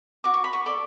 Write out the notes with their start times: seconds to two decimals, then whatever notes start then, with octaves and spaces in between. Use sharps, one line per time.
0.24 F#4 D6
0.34 C#6
0.44 B5
0.53 C#6
0.66 A4 D5